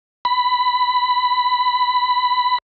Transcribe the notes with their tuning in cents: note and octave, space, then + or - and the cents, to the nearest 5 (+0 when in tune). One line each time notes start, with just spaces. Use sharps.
B5 +10